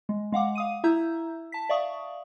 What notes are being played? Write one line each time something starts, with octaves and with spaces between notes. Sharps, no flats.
G#3
G#3 F5 F#5 D6
F5 D#6 D#7
E4 E5 A#5 E6 G6
A5 B6
D5 E5 F5 C#6 D#6